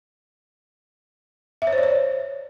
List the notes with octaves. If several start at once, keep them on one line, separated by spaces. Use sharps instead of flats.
E5
C#5
C5
D5
C#5